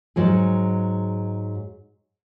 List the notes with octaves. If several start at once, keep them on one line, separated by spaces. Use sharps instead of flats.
G#2 F#3 G#4